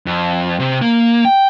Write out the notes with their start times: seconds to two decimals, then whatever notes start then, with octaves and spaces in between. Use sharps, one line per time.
0.06 F2
0.60 C3
0.81 A#3
1.25 G5